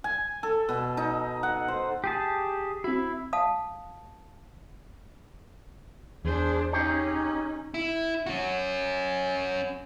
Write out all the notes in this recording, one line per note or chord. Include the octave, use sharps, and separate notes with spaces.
G#5
A4
B2
D#4
F#5
C5
G4 G#4 A5
C4 E4 F#4
F5 A5 D#6
E2 D4 G#4 C5
C#4 D#4 G4 G#4 C#5
E4
C#4 F#4